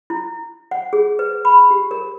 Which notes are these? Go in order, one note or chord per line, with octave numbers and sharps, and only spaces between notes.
E4
F#5
G#4
B4
B5
G4
A#4